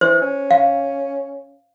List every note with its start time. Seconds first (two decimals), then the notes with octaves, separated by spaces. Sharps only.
0.01 E3 C5
0.22 C#4
0.51 F5